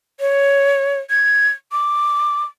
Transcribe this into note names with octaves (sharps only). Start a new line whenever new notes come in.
C#5
G#6
D6